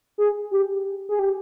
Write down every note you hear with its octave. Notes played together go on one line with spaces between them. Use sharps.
G#4
G4
G#4
G4